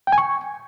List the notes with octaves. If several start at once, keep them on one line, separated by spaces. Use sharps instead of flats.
G5
G#5
C#6